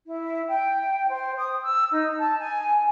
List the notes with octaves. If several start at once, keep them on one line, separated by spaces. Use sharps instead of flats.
E4
G5
C5
D#6
E6
D#4
A5
G#5